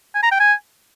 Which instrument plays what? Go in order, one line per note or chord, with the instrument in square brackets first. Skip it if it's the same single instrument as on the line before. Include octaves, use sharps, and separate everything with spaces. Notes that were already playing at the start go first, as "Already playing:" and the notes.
[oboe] G#5
A#5
G5
G#5